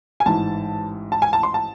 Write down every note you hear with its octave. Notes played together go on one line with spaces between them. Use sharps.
G#5
A1 G#2 E3 A5
A5
G#5
A5
C6
A5